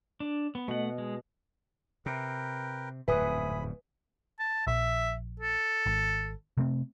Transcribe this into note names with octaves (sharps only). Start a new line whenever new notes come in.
D4
B3
B2 A3 F#5
G#3
C3 A#4 B4 G5
D1 F2 G#2 B4 E5 G#5 B5 D#6
A5
A#1 E5
A4
G#1
C3 A3 C4